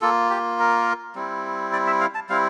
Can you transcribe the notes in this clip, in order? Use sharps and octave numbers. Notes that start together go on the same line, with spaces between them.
A#3 F4 A4
G4
A#4
G3 C4 E4
D5
E5
F5
A5
G3 C4 E4 F5